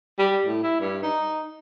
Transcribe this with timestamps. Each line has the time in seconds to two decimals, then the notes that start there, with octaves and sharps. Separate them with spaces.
0.19 G3
0.46 A2
0.63 E4
0.80 G2
1.03 D#4